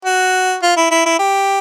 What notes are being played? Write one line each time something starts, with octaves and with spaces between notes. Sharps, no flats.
F#4
F4
E4
E4
E4
G4